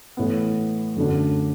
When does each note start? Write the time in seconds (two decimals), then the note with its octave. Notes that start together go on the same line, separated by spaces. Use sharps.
0.17 A2 E3 B3
0.96 F#2 D3 A3 D4